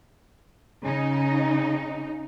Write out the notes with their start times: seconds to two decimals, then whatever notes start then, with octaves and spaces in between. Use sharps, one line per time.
0.84 C#3 D#4